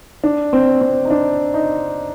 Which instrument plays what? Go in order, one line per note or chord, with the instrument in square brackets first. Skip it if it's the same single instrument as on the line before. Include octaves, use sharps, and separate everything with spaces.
[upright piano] D4
C4
C4
D#4
D4
D#4